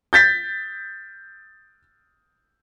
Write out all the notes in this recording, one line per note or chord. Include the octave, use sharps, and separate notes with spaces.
G6 A6 B6